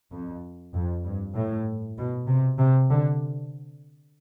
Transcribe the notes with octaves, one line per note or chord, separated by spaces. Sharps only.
F2
F2
G2
A2
B2
C3
C3
D3